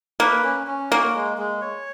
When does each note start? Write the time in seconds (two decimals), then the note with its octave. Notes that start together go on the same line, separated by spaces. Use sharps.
0.20 A#3 B4
0.44 C#4
0.67 C#4
0.90 A#3 F#4
1.15 G#3
1.38 G#3
1.61 C#5